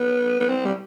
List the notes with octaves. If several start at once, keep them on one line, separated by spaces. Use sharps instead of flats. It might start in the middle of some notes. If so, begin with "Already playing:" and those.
Already playing: B3
B3
C4
G3